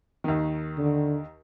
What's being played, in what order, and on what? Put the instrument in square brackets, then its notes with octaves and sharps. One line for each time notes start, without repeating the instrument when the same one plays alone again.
[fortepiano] D#2 D#3
[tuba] D3